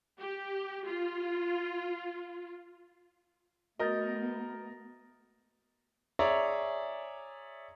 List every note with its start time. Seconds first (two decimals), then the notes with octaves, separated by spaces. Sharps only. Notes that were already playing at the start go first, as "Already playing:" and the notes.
0.19 G4
0.87 F4
3.79 A3 B3 F#4 A#4 D#5 G6 A6
6.19 G#4 C#5 D5 E5 A#5